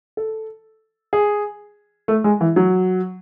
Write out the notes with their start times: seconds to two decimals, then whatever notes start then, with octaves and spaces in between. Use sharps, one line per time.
0.17 A4
1.13 G#4
2.08 A3
2.24 G#3
2.41 E3
2.56 F#3